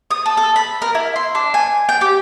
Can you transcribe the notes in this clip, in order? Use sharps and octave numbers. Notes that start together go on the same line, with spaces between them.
D#6
A4
A4
B5
A#4
E4
C6
D4
G#5
G5
G4